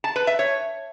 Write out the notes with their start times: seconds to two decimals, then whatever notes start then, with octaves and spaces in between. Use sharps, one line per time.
0.04 A5
0.16 B4
0.27 E5
0.39 C#5